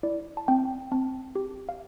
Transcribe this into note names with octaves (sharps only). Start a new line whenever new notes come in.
E4 D5
A5
C4 G5
C4 A5
G4
F5